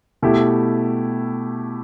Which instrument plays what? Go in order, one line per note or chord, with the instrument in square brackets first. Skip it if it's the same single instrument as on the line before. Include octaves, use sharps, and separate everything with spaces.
[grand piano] B2 A3 E4 G4